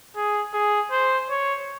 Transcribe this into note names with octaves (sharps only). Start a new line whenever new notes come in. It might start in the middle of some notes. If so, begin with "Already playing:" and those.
G#4
G#4
C5
C#5